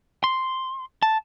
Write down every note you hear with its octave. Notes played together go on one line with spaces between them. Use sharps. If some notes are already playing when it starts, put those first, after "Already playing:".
C6
A5